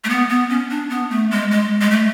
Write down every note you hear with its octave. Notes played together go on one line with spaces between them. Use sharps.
A3
B3
B3
C#4
D4
B3
A3
G#3
G#3
G#3
A3